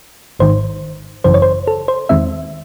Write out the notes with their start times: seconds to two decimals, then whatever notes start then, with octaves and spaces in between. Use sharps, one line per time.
0.39 G#1 G#2 D#3 C5
1.24 G#1 F#2 C#3 E3 C5
1.34 C#5
1.42 C5
1.67 A4
1.88 C5
2.09 E2 D#3 G#3 C4 E5